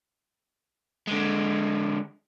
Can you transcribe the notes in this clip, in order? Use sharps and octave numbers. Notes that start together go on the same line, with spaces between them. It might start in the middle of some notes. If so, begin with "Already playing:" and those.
D3 G#3